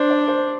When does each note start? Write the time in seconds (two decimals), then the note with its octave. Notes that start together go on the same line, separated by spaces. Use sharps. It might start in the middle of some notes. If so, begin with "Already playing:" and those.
Already playing: D4 C5 D5
0.10 D5
0.28 C5